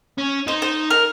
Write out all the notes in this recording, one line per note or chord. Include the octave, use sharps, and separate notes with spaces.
C#4
D#4 C5
C5
A#4